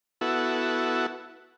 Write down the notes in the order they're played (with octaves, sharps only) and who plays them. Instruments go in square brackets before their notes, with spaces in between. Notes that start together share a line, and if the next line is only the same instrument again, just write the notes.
[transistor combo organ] B3 E4 F#4 A4